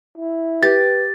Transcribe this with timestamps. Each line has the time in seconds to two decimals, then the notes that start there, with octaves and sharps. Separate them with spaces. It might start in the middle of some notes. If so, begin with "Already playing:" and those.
0.18 E4
0.63 G4 B4 A6